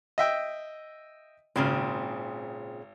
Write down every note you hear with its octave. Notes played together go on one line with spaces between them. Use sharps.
D#5 E5 G5
G#1 A#2 C#3 C4